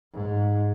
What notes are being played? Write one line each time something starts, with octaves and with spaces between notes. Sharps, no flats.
G#2